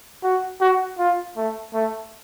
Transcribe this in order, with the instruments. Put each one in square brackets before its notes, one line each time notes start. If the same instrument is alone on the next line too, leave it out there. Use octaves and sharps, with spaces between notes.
[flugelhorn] F#4
F#4
F4
A3
A3